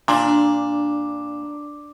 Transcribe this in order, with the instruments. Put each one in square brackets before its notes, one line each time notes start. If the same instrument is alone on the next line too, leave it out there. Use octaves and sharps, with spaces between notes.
[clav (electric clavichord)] A#2 [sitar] D4